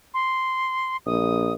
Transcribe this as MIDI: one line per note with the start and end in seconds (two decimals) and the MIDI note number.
0.14 0.97 84
1.06 1.55 34
1.06 1.53 87